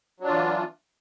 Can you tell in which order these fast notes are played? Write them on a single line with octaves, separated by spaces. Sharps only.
F#3 D4 F4 E3